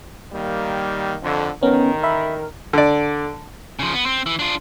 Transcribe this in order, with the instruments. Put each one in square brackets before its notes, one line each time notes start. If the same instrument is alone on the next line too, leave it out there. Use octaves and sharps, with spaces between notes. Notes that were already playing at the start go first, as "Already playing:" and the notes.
[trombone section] D#3 G3 A#3
F2 D3
[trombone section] A1 D#3 A#4 [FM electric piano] B3 C#4
[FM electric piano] E5 B5
[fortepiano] D3 D5
[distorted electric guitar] C#3 F3
B3
C4
E3
D4 F4